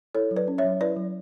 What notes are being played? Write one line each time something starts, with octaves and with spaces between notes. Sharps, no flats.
E4 A4 C#5
F#3
B4 D5
C#4
C#5 E5
F#3
E4 B4 D5
F#3